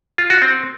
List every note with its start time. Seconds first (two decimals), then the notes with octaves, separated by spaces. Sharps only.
0.18 F4
0.30 F#4
0.42 C4